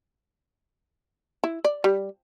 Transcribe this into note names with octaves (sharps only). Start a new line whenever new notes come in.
E4
D5
G3